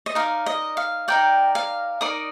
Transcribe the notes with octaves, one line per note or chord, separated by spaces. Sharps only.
D#5
D#4 A#4 D5 F5
D#5
F5
D#4 A#4 D5 G5
F5
D#4 A#4 D5 D#6